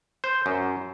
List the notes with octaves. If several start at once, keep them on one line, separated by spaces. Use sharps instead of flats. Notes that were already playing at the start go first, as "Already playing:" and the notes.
C5
F#2